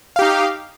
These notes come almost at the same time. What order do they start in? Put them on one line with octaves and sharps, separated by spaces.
F5 G4 D#4